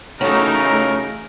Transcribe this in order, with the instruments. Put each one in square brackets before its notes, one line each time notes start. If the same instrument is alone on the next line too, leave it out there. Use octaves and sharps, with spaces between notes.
[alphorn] C#3 [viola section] E3 A3 D#4 [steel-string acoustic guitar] C#4 F#4 A4 [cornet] A#4